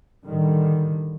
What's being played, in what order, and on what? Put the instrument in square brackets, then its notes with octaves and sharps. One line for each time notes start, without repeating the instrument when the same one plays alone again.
[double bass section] A2 D3 D#3 G3